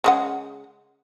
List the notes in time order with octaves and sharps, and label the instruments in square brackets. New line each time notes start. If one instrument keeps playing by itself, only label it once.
[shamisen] C#3 G#3 F#5